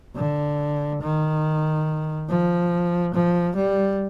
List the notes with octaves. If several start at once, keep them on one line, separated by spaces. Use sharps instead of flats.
D3
D#3
F3
F3
G3